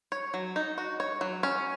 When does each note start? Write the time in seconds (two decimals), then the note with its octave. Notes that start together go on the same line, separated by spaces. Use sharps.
0.12 C#5
0.34 F#3
0.56 D#4
0.78 F#4
1.00 C#5
1.21 F#3
1.43 C#4